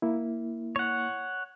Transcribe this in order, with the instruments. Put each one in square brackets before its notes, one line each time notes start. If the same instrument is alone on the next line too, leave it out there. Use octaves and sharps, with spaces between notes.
[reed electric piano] A#3 E4
[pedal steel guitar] C#5 F#5